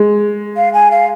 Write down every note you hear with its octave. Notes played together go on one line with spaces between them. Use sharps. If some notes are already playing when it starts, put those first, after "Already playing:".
Already playing: G#3
F5
G#5
F5